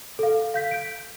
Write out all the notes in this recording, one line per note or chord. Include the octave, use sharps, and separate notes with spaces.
A4 F5
F5 G6 B6
G6 D7